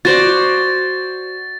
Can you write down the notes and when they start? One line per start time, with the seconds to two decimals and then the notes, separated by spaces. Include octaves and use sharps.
0.05 F#4 C5 D5 A6